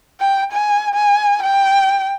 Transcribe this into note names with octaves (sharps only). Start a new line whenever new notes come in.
G5
G#5
G#5
G5